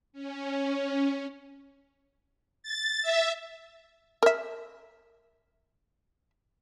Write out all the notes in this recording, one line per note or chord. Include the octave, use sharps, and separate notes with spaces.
C#4
A6
E5
A#4 E5